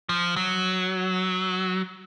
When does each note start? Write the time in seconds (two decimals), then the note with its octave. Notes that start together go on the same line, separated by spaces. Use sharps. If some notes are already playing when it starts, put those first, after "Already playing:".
0.09 F3
0.36 F#3